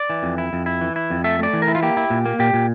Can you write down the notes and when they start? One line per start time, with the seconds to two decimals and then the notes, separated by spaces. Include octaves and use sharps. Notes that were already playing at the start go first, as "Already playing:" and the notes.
Already playing: D5
0.10 E3
0.23 F2
0.38 E4
0.53 F2
0.66 E4
0.81 E3
0.96 E4
1.10 F2
1.24 A3 E5
1.39 A3 D5
1.53 E3
1.62 A#4
1.68 E4
1.75 F4
1.82 A#3 G4
1.97 E4
2.10 A#2
2.26 A#3
2.39 A#2 G4
2.53 A#2